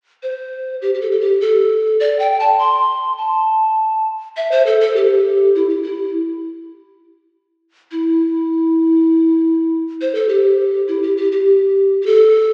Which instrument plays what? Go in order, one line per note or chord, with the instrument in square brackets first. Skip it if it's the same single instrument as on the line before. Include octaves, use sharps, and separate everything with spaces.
[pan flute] C5
G4
G4
A4
A4
G4
A4
D5
G5
A5
C6
A5
E5
C5
A4
A4
G4
E4
G4
E4
E4
C5
A4
G4
E4
G4
G4
G4
G4
A4